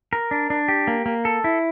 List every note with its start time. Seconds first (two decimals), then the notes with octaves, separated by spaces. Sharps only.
0.13 A#4
0.31 D4
0.50 D4
0.68 G4
0.88 A#3
1.06 A#3
1.25 A4
1.44 E4